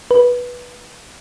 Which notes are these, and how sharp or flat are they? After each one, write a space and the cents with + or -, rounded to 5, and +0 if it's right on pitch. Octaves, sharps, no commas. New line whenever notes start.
B4 -10